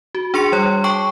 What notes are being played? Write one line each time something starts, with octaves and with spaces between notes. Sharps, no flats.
F#4
D4 G#4 C6 C#7
G3 C#5
G5 A5 C#6 D6